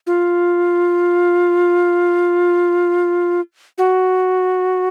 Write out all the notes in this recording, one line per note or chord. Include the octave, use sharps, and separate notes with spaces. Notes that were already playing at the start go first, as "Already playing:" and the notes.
F4
F#4